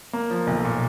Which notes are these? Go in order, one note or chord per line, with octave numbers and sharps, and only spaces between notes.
A#3
F3
B1
A#2